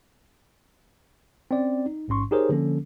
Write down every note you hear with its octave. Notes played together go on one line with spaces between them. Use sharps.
C4 C#4 D5
D#4
A1 G#2 C#4 C6 C#6
D#4 G4 G#4 A#4 C5 C#5
D3 F3 A#3 C#4 A4